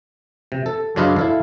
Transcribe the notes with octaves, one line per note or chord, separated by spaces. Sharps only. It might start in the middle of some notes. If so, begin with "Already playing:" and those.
C3
A4
F#2 C#3 D4 F4 B4 D#5
E4 A4 F5